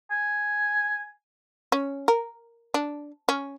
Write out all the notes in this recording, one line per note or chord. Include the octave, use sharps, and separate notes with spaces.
G#5
C#4
A#4
D4
C#4